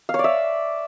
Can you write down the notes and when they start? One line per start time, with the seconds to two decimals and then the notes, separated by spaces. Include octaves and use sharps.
0.09 F5
0.14 C#5
0.19 D5
0.24 E5